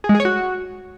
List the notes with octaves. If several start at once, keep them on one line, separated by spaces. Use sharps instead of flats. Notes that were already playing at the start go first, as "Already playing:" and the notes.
G#4
G#3
G#4
C#5
F#4